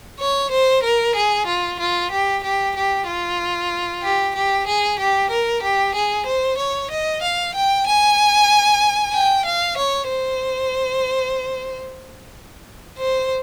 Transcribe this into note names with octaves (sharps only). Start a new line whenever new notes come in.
C#5
C5
A#4
G#4
F4
F4
G4
G4
G4
F4
G4
G4
G#4
G4
A#4
G4
G#4
C5
C#5
D#5
F5
G5
G#5
G5
F5
C#5
C5
C5